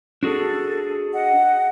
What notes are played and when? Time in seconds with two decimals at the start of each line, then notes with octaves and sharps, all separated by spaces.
0.23 D4 F#4 G#4 A4
1.13 D#5 F#5